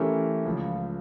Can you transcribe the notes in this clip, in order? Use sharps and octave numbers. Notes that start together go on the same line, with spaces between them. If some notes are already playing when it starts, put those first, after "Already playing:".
Already playing: E3 A3 C#4 G4 A#4
C#2 C#3 F3 C#4